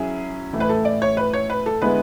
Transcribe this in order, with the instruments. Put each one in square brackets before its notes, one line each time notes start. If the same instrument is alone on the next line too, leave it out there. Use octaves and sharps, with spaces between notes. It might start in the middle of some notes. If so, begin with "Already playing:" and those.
Already playing: [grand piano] F#3 C#4 E4 [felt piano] G#4
[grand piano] A2 E3 A3 E4
[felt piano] B4
A4
D5
C#5
B4
C#5
B4
A4
[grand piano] D3 G#3 B3 E4 [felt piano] B4